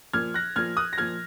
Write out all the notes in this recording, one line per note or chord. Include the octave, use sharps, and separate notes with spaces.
A#2 F3 F6 G#6
F#6 A#6
A#2 F3 F6 G#6
D#6 F#6
A#6
A#2 F3 F6 G#6